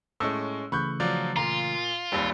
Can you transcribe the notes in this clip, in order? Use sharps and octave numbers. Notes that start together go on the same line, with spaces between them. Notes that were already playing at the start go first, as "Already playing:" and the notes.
A2 G#3 C#4 E6
C#3 E3 A3 B5 C#6 F#6 G6
F3 F#3 F4 D5
A#2 F4 A#5
G#1 D#2 G3